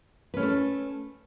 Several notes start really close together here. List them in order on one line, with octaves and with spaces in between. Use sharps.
B4 C#4 A3 A4